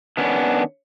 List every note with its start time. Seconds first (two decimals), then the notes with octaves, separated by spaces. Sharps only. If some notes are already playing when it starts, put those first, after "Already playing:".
0.17 D#3 B3 C#4 D4